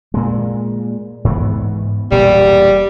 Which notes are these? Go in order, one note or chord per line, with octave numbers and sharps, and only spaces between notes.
A#2 G#3
G#2 E3 B3
E1 G2 A#2 G3